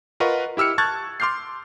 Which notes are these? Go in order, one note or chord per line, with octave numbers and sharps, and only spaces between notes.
F4 A#4 B4 D#5 F#5 C#6
E4 G4 E6 F6 C#7
A5 C#6 F6 F#6 G#6 A6
C6 D6 F6 G6 C7